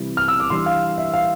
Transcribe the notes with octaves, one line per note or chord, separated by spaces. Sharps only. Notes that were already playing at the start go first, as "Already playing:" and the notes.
Already playing: C3 E3 G3 C4 E4
F6
E6
D6
E3 G3 D4 C6
F5
E5
F5